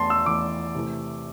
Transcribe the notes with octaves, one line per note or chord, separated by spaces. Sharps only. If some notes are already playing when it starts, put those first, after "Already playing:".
Already playing: E2 E3 A3 A5 C6
E6
E2 E3 A3 D6
C3 E3 A3